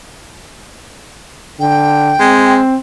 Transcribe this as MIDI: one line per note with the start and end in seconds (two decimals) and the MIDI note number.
1.60 2.15 50
1.60 2.53 79
2.20 2.60 56
2.20 2.76 60